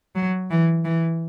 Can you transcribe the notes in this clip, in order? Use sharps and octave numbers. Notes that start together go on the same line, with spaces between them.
F#3
E3
E3